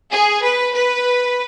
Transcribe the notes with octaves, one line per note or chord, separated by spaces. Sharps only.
G#4
B4
B4